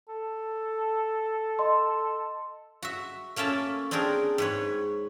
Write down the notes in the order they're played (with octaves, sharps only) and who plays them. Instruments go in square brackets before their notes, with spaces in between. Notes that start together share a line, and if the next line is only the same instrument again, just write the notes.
[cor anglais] A4
[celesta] D#5 C6
[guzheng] F#4 E5
A3 A#3 C#4 E5 A5
C4 D4 G4 G#4 A#4
G#2 B4 C#5